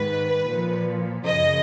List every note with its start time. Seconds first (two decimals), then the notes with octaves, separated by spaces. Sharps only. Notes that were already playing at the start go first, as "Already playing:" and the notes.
Already playing: G#2 D#3 B4
0.50 A#2 F3
1.26 F#2 C#3 F3 D#5